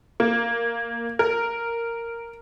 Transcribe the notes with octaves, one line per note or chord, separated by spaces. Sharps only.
A#3
A#4